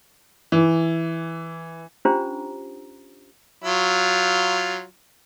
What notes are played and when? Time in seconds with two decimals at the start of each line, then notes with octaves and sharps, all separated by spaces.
0.52 E3
2.05 C#4 D4 F4 G4 C5 A#5
3.64 F#3 F4